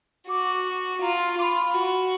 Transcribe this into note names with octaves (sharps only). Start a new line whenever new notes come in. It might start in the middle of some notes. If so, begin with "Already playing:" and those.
F#4 D6
F4 A#5
F4 B5 D6
F#4